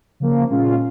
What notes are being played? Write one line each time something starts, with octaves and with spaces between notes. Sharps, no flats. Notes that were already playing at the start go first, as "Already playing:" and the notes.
C#3 F3 A#3
A#2 G#3 C#4 F4